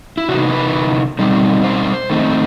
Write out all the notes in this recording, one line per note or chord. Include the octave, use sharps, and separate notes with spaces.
E4
C3 E3 B3 D#4 F#4
B4
B2 G3 C4 D#4
C5
D#3 A3 C4 D#4